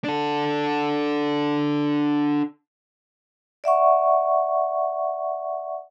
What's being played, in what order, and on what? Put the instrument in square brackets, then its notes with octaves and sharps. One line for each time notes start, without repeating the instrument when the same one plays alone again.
[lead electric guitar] D4 A4
[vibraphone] D5 E5 F#5 C#6